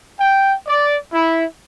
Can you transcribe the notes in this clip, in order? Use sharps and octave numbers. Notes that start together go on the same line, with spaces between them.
G5
D5
E4